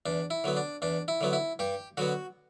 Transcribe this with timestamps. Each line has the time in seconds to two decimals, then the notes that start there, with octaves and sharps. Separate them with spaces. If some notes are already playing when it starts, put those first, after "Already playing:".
0.06 E2 D4
0.30 E4
0.44 D3 F#3 B3
0.57 D4
0.82 E2 D4
1.08 E4
1.21 D3 F#3 B3
1.33 E4
1.59 G2 G4
1.97 D3 F#3 B3 F#4